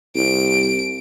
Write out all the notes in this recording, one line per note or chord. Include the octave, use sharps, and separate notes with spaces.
C2 D7